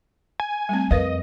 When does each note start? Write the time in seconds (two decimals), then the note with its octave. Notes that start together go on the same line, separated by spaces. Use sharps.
0.40 G#5
0.69 G3 A3 C4
0.91 F2 A#4 B4 D#5 F5